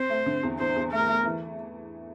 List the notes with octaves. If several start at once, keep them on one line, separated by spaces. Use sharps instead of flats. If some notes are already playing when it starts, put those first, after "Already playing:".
Already playing: C4 C5
A3
D3
E2
E2 C5
E2
A3 A#4
A3
E3